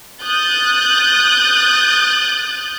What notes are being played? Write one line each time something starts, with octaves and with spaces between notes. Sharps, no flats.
D#6 F#6 G6 A6